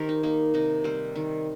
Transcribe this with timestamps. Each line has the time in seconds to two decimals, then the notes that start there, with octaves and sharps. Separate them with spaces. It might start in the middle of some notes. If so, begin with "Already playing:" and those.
Already playing: D#3 G4 A#4 C5
0.09 D#4
0.23 A#3 D#4
0.54 C3 D#4
0.84 G3 C4
1.16 D#3